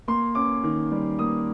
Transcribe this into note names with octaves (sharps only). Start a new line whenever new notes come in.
A#3 C6
C#4 D6
D#3
G3
A#3 D#6